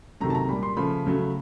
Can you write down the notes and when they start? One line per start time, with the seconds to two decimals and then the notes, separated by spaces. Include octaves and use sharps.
0.20 C3 D#3 F#3 A3 A#5
0.30 A5
0.35 A#5
0.49 A#2 G3 B5
0.63 C6
0.77 C#3 F3 A3 B5
1.05 C#3 F#3 A3